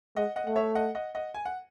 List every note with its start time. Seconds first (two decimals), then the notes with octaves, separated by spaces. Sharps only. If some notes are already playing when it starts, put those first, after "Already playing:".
0.16 G#3 D#5 F#5
0.36 D#5 F#5
0.47 A3 F#5
0.56 C#5 E5
0.75 D#5 F#5
0.95 D#5 F#5
1.15 D#5 F#5
1.34 G#5
1.45 F#5